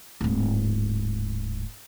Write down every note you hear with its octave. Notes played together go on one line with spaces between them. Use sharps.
D1 G#2